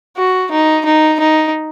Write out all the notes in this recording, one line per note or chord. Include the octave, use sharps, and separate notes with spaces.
F#4
D#4
D#4
D#4